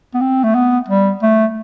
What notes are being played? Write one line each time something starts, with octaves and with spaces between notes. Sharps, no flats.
B3
C4
A3
B3
G3
A3